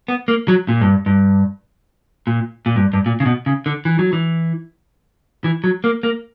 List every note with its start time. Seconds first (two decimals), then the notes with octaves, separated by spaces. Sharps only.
0.08 B3
0.28 A#3
0.48 F#3
0.68 A#2
0.81 G2
1.06 G2
2.27 A#2
2.66 A#2
2.76 G2
2.93 G2
3.06 A#2
3.20 C#3
3.26 B2
3.46 C#3
3.66 D3
3.85 E3
3.99 F#3
4.13 E3
5.44 E3
5.64 F#3
5.84 A#3
6.03 A#3